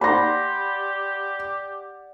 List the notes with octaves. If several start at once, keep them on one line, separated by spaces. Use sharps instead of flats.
G4 D5 F#5 B5 C6 A#6